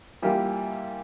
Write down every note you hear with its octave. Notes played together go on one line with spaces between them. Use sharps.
E3 G3 A#3 F4